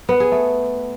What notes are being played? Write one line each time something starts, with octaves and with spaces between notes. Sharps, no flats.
B3
G#4
A3